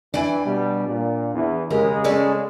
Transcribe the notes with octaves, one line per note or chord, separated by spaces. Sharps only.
E3 D4 G5 G#5
B2 G3
A#2
E2 E3
D#2 C#3 G#3 G4 A#4
C#4 A4 D5